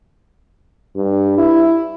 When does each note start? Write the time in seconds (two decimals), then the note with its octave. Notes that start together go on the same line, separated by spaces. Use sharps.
0.96 G2
1.38 E4